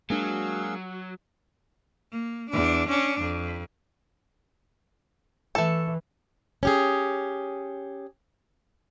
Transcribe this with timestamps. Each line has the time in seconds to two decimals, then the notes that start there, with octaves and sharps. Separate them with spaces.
0.10 F#3 G#3 A#3 D4 G#4 F5 E6
2.12 A#3
2.50 E2 D4
2.89 C#4 D4
3.21 F2
5.55 E3 A3 A4
6.63 C#4 G4 G#4